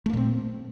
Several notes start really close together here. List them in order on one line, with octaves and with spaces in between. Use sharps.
A3 A#3 A#2 C4